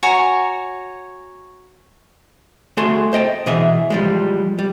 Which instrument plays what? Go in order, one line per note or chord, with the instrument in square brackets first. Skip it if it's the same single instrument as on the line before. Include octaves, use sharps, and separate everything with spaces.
[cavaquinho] F#4 C#5 G#5 A#5
[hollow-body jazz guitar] A3 F#4 G#4 A5 C6
C5 D#5 G5 A5
B2 E3 G#4 D#5 E5
F3 G3 G#3
G3